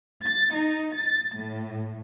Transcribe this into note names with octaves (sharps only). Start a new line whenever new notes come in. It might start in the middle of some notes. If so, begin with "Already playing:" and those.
A6
D#4
A6
A2